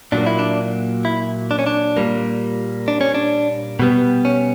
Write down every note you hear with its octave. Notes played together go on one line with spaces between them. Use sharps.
A#2 F#3 A#3 D4
E4
D4
E4
D4
C#4
D4
A#2 G3 A#3
D4
C#4
D4
B2 G3 B3
C#4